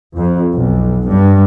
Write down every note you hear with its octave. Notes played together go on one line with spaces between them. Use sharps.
F2
B1
G2